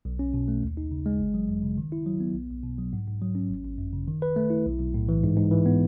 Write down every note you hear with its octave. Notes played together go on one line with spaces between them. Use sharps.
B1
C#4
B2
A3
D#2
D#4
C#3
G#3
G#1
F#3
F#2
C#3
D#3
E4
F#3
B3
B1
B1
B2
F#3
G#2
G#2
F#3
C#4
G#1
G#1
F#2
C#3
D#3
B4
A3
E4
B1
B1
A2
E3
G#2
G#2
E3
B3